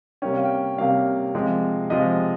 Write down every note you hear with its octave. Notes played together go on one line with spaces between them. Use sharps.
C3 G3 A#3 C#4 G5
F5
G5
C3 G3 A#3 C#4 F5
C3 F3 G#3
C3 F3 G#3 D#5